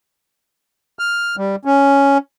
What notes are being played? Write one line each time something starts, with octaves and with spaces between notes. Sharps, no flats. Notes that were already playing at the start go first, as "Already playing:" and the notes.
F6
G3
C#4